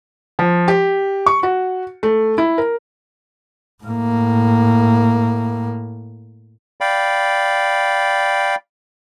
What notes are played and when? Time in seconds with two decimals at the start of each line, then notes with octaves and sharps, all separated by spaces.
0.39 F3
0.68 G4
1.26 C#6
1.43 F#4
2.03 A3
2.38 E4
2.58 A#4
3.84 A2 A#3
6.81 D5 F5 G5 B5